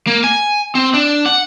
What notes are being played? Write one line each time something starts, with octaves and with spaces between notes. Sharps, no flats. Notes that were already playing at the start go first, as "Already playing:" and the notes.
A#3
G#5
C4
D4
F#5